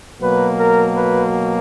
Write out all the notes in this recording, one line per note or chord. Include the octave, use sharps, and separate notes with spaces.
B2 F#3 A#3 B4
A#4
B4